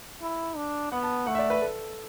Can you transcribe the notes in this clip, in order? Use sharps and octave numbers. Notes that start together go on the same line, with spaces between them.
E4
D4
B3 F#5
A5
A3 F#5
E5
D5
B4
A4